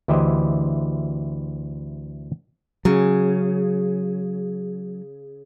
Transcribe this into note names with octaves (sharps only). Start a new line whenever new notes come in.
D2 E3 E4 G4 C5 D#5
C#3 F#3